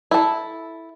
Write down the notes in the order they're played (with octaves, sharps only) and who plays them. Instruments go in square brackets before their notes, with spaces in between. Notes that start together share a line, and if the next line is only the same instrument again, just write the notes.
[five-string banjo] E4 A4